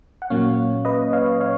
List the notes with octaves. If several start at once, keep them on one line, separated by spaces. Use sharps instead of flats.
F#5
A#2 F#3 A#3 C#4 C#5 F5
B4 D#5
C#5 F5
C#5 F5